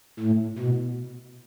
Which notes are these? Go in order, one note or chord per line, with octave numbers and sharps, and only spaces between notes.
A2
B2